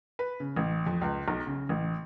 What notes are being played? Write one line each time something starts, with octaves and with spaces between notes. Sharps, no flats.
B4
C#3
A1
F2
C#2
B1
C#3
A1